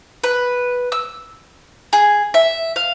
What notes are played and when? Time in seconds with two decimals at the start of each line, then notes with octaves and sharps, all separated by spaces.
0.24 B4
0.92 E6
1.93 G#4
2.34 E5
2.76 F5